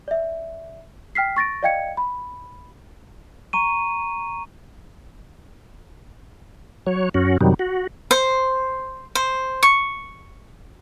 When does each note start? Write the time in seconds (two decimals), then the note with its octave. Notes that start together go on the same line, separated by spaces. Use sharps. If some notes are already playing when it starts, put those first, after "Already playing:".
0.08 D5 E5
1.15 G5 F6 B6 C7
1.36 C#6 A6 A#6 D7
1.63 D5 D#5 F5 G5 G#6 C#7
1.97 B5
3.53 A#5 C#6 D#7
6.87 F#3 C#5
7.14 F#2 C#4 F#4
7.41 F#2 C3 D#3 F#3 G3
7.59 F#4
8.11 C5
9.15 C5
9.63 C#6